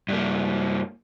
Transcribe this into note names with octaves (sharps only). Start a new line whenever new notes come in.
G2 A#3